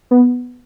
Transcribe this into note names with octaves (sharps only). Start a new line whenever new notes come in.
B3